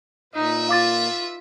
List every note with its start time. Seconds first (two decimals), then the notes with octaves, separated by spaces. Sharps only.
0.34 A#2 D#4 B4 E5
0.69 F4 F5 D6 A6